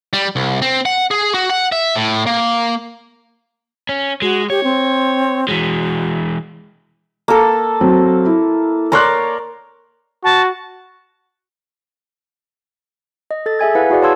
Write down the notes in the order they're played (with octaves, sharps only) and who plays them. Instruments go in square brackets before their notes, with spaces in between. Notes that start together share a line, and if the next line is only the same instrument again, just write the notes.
[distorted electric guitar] G3
C2
C4
F#5
G#4
F#4
F#5
E5
A2
A#3
[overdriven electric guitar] C#4
[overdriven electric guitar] G#3 [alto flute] F#4
[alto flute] G4 [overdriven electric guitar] C#5
[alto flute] C4
[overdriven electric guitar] E3 G#3 [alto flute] F#4
[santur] A#3 A4
[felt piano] F#3 C4
E4
[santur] A#4 C#5 D5 [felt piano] A#5 C6 F#6
[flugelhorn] F#4 [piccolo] A5
[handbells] D#5
A4 A6
G#4 E5 G#5 G#6
E4 B4 F5 F#5
E4 F#4 G#4 D5 F#5
C#5 F5 A5 C6 E6 G#6